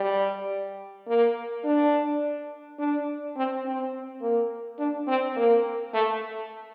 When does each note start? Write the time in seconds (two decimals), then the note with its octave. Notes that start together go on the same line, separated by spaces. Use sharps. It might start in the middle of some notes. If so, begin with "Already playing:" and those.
Already playing: G3
1.07 A#3
1.64 D4
2.78 D4
3.36 C4
3.65 C4
4.22 A#3
4.78 D4
5.07 C4
5.36 A#3
5.93 A3